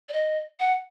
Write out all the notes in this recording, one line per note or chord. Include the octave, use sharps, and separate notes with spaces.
D5
D#5
F#5